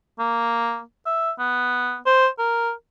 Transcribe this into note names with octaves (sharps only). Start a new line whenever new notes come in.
A#3
E5
B3
C5
A#4